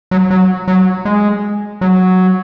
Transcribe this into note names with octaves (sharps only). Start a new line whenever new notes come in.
F#3
F#3
F#3
G#3
F#3